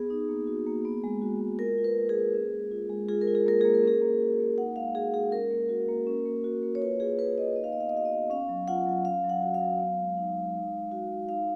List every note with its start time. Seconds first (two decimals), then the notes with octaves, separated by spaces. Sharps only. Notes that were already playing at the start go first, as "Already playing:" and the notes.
Already playing: B3 G#4
0.10 D#4
0.29 A#3
0.47 F#4
0.67 A#3
0.85 B3
1.04 G#3
1.22 F#4
1.41 G#3
1.59 F4 A#4
1.78 F4
1.84 B4
1.97 A#3
2.09 G#4
2.15 A#3
2.34 C#4
2.53 G#3
2.72 F4
2.89 G#3
3.09 F4 G#4
3.21 A#4
3.28 F4
3.35 G#4
3.46 A#3 A#4
3.61 A#3 G#4
3.74 A#4
3.83 C#4 G#4
4.02 A#3
4.20 F#4
4.39 A#3
4.57 D#4 F#5
4.76 G#3 F5
4.95 F#4 G#4
5.13 G#3 G#4
5.32 C#4 A#4
5.51 A#3
5.69 F#4
5.89 A#3
6.07 C#4
6.26 A#3
6.44 F#4
6.63 A#3
6.75 C#5
6.81 F4 B4
7.00 F4 G#4
7.19 A#3 B4
7.37 A#3 D#5
7.56 D#4 D#5
7.64 F5
7.72 B3 D#5
7.81 F5
7.89 D#5
7.94 F#4 F5
8.05 D#5
8.12 B3
8.30 C#4 F5
8.49 F#3
8.68 F4 F#5
8.87 F#3
9.05 C#4 F5
9.24 F#3
9.30 F#5
9.42 F#4
9.54 F5
9.61 F#3
9.80 B3
9.99 G#3
10.17 D#4
10.36 G#3
10.55 D#4
10.73 G#3
10.91 F#4
11.10 G#3
11.29 D#4 F5